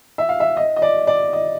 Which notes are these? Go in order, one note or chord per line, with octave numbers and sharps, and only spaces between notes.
E5
F5
E5
D#5
D#5
D5
D5
D#5